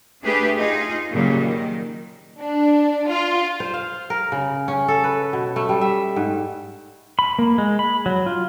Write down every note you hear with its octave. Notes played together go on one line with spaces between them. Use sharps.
A3 D4 G4 G#4 B4
D#4 F4 G#4
A#2 C#3 F#3 G3
D#3
D4
F4
C5
F5
A#4
C#3
C#4
A4
B4
B2
A3
G3
E5
G#2
B5
A#3
G#3
B5
F#3
F4